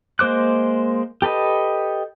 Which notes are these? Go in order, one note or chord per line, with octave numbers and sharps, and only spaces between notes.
G#3 A#3 C5 D6 F#6
G4 A4 B4 D#5